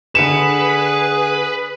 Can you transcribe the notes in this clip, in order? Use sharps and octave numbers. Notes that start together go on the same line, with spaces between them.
D3 G#4 B4 C#7 E7